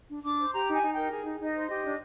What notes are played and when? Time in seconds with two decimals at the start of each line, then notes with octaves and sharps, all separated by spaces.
0.09 D4
0.23 D4 D6
0.38 C5
0.53 G4 A#5
0.67 D#4 G#5
0.82 D#4
0.92 G5
0.97 A#4
1.11 G#4
1.25 D#4
1.40 D#4 D#5
1.55 C5
1.69 G4 D#5
1.85 D4